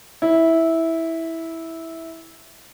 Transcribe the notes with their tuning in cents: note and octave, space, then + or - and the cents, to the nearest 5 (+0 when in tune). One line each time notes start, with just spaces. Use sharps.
E4 -10